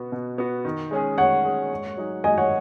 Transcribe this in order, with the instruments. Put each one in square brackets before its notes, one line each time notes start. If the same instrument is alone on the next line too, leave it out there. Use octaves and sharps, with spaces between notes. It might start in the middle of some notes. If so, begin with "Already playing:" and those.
Already playing: [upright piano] B2 B3 F#4
B2
B3 F#4
D#3
G#3 C#4 G#4
[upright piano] D#3 [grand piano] C#5 F#5
[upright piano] G#3 C#4 G#4
G#2
F#3 D#4 G#4
[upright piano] G#2 [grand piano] D#5 G#5
[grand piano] C#5 F#5